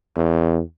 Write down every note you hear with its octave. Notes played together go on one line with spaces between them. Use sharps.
E2